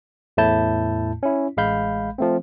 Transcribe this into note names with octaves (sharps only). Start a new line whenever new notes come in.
E2 A2 A3 E4 A5 G6
C#4 E4
A1 G#3 F5 B5 G6
F3 A3 C4